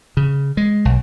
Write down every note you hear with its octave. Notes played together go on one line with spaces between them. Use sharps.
C#3
G#3
B1